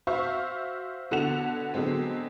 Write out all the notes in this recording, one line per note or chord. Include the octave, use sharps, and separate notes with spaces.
F#4 C5 E5 F5 C#6
B2 D3 A4 F#5 F7
B2 D3 F#3 G#3 C4